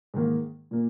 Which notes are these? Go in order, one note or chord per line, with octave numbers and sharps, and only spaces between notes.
G#2 D#3 A#3
A#2 A#3